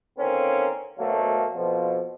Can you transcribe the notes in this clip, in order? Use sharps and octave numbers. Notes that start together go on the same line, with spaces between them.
D3 D#3 A#3 C4 C#4
D2 B2 F#3 A3 A#3
F2 B2 F3